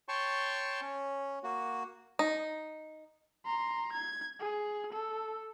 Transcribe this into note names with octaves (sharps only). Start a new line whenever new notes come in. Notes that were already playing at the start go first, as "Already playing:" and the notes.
C#5 G5 A5 C6 C#6
C#4
A#3 F#4
D#4
A#5 C6
G#6
G#4
A4